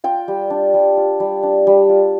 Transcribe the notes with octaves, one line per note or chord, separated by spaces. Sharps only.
F4 G5
G3
D4
G3
F4
G3
D4
G3
F4